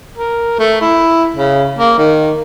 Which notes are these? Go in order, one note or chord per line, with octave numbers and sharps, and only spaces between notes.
A#4
A3
E4
C#3
A#3
D#3